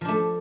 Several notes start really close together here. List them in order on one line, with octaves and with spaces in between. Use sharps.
F3 D4 A3